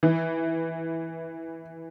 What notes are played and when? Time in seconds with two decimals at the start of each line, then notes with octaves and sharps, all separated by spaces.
0.03 E3